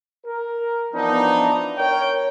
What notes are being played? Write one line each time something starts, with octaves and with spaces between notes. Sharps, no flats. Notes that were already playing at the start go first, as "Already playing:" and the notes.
A#4
E3 F3 B3 D4 D#4
A#4 C#5 G5